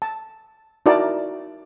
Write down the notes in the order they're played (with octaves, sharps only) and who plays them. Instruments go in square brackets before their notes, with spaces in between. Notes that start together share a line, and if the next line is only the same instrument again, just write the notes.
[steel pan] A5
D#4 E4 F#4 A#4 D5 A5